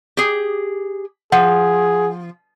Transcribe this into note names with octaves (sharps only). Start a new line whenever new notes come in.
G4 G#4
F3 G#4 F#5